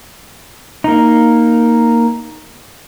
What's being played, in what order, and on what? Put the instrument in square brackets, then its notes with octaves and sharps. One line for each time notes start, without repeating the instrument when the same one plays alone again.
[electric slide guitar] A#3 D#4